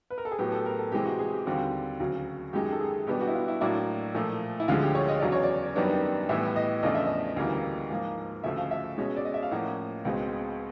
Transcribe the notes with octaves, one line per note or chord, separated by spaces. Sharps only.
B4
A#4
A4
G#4
A2 F#3 B3 G4
A4
A#4
A4
C3 E3 G#3 C4 G4
F#4
G#4
G4
D#2 D3 G3 C4 F#4
D2 C#3 F#3
F#2 D#3 G#3 G4
A4
G#4
B2 G3 B3 D4 G4
F#4
E4
F4
E4
A2 F#3 A#3 D4 E4
A#2 F3 A3
E4
D2 D3 F3 G#3 F4
G4
C#5
D#5
E2 C#3 F#3 D5
C#5
D5
F#2 D#3 G3 B3 D4
A2 E3 G3 B3 E5
D#5
E2 C#3 F3 A3 D4 D#5
E5
D#5
D2 C#3 E3 G3 A#3
G#2 F3 A#3
D2 C#3 F3 A3 E5
F5
E5
B2 G#3 C#4
D5
D#5
E5
F5
A2 F3 A#3 C#4 F#5
C#2 B2 G#3 C4